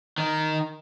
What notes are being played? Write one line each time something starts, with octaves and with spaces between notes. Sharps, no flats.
D#3